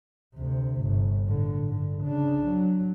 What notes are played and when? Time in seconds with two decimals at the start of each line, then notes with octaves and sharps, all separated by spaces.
0.35 D2 C3
0.82 G1
1.24 A2 D3
1.65 G2 D3
2.02 C#3 D4
2.46 F#3